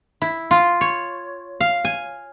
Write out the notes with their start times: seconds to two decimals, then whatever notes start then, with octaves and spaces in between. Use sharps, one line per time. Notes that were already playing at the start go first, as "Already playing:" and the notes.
0.22 E4
0.51 F4
0.81 C#5
1.61 F5
1.85 G#5